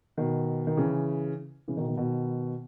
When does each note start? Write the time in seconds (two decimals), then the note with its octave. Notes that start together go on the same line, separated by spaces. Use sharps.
0.17 B2 D#3
0.67 D#3
0.77 C#3 E3
1.68 C#3 E3
1.77 B2 D#3
1.87 B2 D#3
1.97 B2 D#3